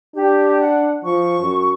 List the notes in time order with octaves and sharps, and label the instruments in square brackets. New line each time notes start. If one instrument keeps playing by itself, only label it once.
[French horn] D4 [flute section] G4
[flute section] F#5
[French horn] F3 [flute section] C#6
[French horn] F#2